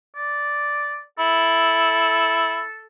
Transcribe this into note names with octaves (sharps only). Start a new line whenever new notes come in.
D5
E4 A4